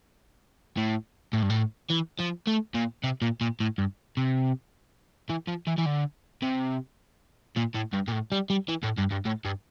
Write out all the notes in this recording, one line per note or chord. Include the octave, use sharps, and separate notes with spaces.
A2
A2
G2
A2
E3
F3
A3
A#2
C3
A#2
A#2
A2
G2
C3
E3
F3
E3
E3
D3
C3
A#2
A2
G2
A#2
A2
G3
G3
E3
A2
G2
G2
A2
G2